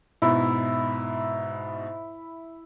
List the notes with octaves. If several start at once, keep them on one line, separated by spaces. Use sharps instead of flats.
G#2 B2 E4